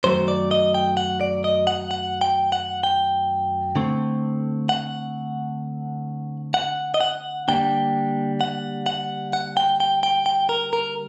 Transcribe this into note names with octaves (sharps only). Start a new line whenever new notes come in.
F#2 D#3 F#3 A3 C5
D5
D#5
G5
F#5
D5
D#5
F#5
F#5
G5
F#5
G5
D3 A3 C4
F#5
F#5
D#5
F#5
D3 G3 A#3 D4 G5
F#5
F#5
F#5
G5
G5
G5
G5
A#4
A#4